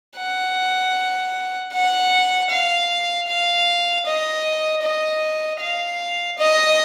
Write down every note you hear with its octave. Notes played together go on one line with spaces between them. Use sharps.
F#5
F#5
F5
F5
D#5
D#5
F5
D#5